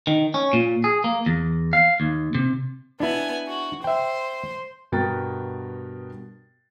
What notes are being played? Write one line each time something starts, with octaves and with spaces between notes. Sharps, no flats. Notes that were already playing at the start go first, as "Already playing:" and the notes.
D#3
C#4
A#2
G#4
A#3
E2
F5
D#2
C3
B3 D4 E4 G#5
F#4
C5 E5 G5
G2 B2 B3 A#4 G5 A6